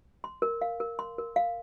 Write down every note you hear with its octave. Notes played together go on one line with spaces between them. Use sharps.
C6
A#4
F5
A#4
C6
A#4
F5